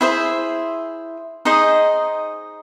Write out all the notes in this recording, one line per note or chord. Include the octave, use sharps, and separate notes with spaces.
E4 G#4 C5 E5
D#4 G#4 C5 D#5